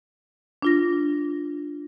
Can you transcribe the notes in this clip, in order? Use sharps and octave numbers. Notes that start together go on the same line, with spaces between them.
D4 F4 A#6